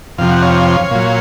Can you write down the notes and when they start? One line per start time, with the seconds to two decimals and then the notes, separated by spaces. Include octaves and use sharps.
0.18 F2 C3 F3 F5
0.31 F#5
0.42 C#5 F5
0.91 A#2 F#3